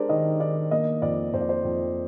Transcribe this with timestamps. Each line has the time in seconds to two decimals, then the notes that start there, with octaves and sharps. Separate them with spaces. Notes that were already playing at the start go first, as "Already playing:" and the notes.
Already playing: G#3 D4 G4 A#4 C5 D5
0.09 D#3 D#5
0.40 D#3 D5
0.71 A#3 D#5
1.02 F2 D5
1.33 F2 C5
1.41 D5
1.49 C5
1.64 F2